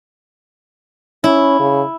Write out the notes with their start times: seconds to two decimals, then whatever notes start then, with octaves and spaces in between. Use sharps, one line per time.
1.24 C#4 E4
1.60 C#3